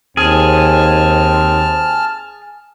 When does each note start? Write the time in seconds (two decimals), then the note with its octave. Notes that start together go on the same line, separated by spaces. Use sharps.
0.17 D#2 C4 G#4 A5 F6